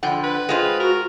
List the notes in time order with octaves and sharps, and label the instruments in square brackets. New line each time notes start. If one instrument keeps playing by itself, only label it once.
[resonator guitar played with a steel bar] D3 F3 [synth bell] F#5 G5 B5
[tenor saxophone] B4
[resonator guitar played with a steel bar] G#3 F4 C5
[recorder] F#4 [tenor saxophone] A#4